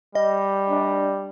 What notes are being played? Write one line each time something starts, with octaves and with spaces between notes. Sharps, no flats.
G3 D#5
D4